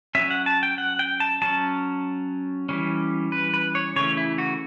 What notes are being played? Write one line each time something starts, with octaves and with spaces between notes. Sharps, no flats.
F#3 C#4 E5
F#5
A5
G5
F#5
G5
A5
F#3 C#4 A5
E3 G3 C#4
B4
B4
C#5
C#3 E3 A3 C#4 C#5
E4
F#4